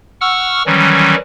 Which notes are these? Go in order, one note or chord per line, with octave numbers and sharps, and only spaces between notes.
F#5 C#6 E6 F6
D#3 E3 F#3 G3 C#4